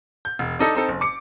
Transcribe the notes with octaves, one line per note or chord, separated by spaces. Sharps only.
G6
E1
D4 D#4 A4 D#5
C4 D#4 A4
F#1
D6 C#7